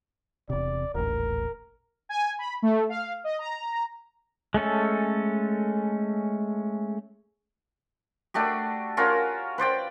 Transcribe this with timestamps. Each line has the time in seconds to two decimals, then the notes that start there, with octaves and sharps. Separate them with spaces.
0.50 E1 C3 D5
0.95 D#1 A1 A#4
2.09 G#5
2.39 B5
2.62 A3
2.89 F5
3.24 D#5
3.39 A#5
4.54 G#3 A3 C#4 A4
8.34 A3 D4 F#4 G4
8.97 C#4 F4 F#4 A#4
9.58 B4 C5 D5 G5